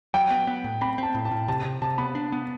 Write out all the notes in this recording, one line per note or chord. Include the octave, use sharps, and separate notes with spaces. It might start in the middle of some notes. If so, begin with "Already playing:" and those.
F#3 G5
B3
B3
A2
C4 B5
C4 A5
A2
A5
A2
C3 A5
C3
C3 A5
B3 B5
D4
B3